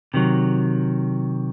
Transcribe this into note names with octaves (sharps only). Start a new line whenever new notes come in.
C3 D#3 F#3